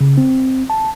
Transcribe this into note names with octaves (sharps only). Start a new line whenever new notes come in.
C#3
C4
A5